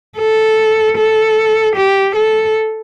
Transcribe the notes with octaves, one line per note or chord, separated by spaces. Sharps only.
A4
A4
G4
A4